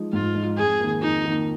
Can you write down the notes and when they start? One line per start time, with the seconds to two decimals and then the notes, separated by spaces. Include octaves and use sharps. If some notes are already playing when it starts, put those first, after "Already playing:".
Already playing: F3 G#3 D#4
0.13 G#2 F4
0.35 F3 G#3 D#4
0.58 F2 G#4
0.80 D#3 A#3
1.02 F2 D#4
1.25 D#3 A#3